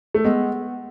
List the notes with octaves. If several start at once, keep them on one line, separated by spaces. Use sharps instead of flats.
A3
G#3 B3